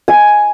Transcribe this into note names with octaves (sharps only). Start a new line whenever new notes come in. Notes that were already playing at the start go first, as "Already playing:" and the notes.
G#5